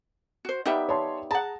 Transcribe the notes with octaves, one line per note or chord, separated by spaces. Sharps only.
F#4 C5
D#3 G3 B3 D#4 G4 E5
C#5 A5 C6
G#4 F#5 A5 A#5